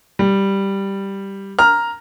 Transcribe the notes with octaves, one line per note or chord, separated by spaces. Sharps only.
G3
A#5 F6